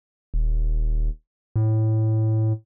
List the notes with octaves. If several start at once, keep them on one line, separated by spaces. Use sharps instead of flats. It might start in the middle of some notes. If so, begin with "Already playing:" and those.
D#1
A2